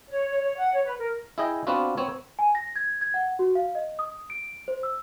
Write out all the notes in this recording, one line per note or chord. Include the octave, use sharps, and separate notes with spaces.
C#5
C#5
C#5
F#5
C#5
B4
A#4
E4 G#4 D#5 G5
B3 C4 D4 F4 F#4 B4
B3 C4 C#5
G#5
A#6
G#6
G#6
F#5
F#4
F5
D#5
D#6
D7
C5
E6